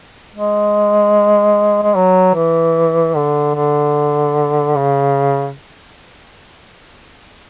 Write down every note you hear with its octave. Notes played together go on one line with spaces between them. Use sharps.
G#3
G#3
F#3
E3
D3
D3
C#3